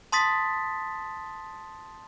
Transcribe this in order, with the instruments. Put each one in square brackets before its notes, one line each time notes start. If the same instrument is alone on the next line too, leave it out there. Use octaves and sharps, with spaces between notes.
[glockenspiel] A5 C6 D#6 A6 B6